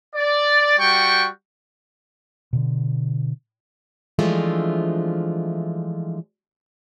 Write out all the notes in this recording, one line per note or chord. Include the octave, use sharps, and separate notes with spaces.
D5
G3 F#4 G5 C#6
B2 D3
E3 F3 G#3 A3 D4 F4